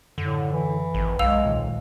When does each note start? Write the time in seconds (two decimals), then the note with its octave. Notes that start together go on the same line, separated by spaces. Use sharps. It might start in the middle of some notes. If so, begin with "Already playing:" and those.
0.18 F#2 A2 D3
0.52 E3
0.94 G#1
1.19 B1 G#3 F5 E6 F7
1.45 D2 A#2 D#3